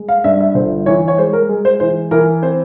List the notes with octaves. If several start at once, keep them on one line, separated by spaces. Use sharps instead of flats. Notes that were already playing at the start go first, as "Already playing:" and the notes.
Already playing: G#3
F5
G2 E5
E5
G1 C5
E3 C#5
C#5
G#3 C5
A#4
G#3
C5
E3 C5
E3 A#4
C4 C5